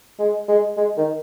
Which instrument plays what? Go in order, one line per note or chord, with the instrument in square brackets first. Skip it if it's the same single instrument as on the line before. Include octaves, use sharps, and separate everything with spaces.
[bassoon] G#3
G#3
G#3
D#3